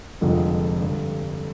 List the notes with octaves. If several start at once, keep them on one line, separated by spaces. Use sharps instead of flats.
F1 F2 D3 F3 G#3
G2 D3 G3